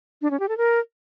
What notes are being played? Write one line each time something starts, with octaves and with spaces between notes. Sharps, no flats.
D4
C#4
G4
A4
A#4